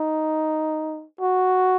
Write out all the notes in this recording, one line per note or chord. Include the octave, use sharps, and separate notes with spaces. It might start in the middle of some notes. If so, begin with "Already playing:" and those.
Already playing: D#4
F#4